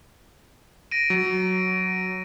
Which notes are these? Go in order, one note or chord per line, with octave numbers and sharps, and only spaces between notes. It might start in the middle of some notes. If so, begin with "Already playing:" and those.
A#6 D7 D#7
F#3